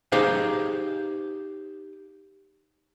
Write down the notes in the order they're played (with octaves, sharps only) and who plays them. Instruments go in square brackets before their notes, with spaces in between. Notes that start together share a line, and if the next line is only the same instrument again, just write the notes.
[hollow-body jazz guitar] D#4 G4 G#4 C5 F5